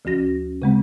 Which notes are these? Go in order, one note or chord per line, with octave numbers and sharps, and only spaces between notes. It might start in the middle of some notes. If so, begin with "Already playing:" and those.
D2 F3 C#4 F#4 A#6
C#3 G#3 C4